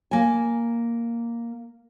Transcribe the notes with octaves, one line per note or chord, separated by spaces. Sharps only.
A#3 G#5